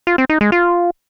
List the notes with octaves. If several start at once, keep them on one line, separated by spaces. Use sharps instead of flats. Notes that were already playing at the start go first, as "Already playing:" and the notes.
F4
C4
D#4
G#3
F4